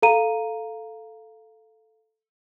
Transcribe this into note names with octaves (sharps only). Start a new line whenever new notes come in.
A4 F5 A#5 D#7